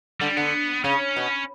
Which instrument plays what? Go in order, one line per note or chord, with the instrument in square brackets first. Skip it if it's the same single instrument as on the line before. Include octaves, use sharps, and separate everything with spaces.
[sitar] D3 [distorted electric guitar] G3
[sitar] D3 [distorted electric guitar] B3
[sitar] C#3 [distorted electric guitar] C#4
[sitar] B2